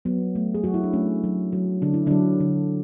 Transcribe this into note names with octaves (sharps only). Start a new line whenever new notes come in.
F#3 B3
A3
G#4
F#3 F#4
E4
D4
A3 C#4
F#3
F#3
D3 D4
E4
D3 F#3 D4
D3